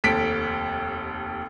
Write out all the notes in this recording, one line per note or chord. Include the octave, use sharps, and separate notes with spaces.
F1 D#2 A4 B6 D7